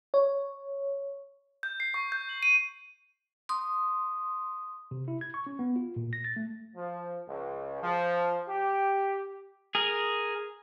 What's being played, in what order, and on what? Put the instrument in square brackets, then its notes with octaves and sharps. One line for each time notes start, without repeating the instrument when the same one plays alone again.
[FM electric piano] C#5
[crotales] G6
C7
C#6
G6
F#7
D#7
[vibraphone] C6 D#6
[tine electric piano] C3
E4
G#6
C#6
C#4
B3
F4
A#2
A#6
A6
A3
[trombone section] F3
C#2
F3
G4
[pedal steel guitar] G#4 A#4